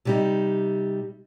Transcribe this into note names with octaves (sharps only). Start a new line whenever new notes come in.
C3 G3 D#4